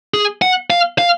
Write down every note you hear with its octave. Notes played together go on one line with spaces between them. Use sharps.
G#4
F#5
F5
F5